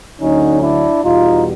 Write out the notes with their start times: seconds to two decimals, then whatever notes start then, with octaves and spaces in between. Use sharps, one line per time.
0.21 D2 D3 F#3 C#4 D#4
0.62 D4 E4
1.03 E2 B2 G3 D#4 F4